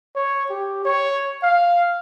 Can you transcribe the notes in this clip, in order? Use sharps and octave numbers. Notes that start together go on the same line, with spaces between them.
C#5
G4
C#5
F5